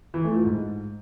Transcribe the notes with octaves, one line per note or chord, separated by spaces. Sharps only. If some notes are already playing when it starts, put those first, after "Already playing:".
E3
A3
F3
G#2